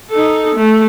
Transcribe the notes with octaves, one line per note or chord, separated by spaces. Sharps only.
D#4 A4
A3